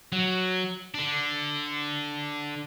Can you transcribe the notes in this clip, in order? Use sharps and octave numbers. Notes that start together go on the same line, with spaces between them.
F#3
D3 D4